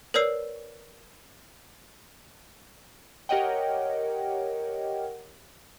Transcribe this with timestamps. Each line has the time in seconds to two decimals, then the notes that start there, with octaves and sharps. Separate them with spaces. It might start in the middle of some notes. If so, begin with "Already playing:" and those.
0.14 A#4 B4 C#5 D5 E6 C7
3.29 G4 A#4 C#5 D#5 F#5 G5